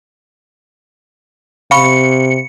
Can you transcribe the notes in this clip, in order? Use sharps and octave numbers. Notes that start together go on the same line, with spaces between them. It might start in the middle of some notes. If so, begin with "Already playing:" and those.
C3 F5 B5 C#6 C#7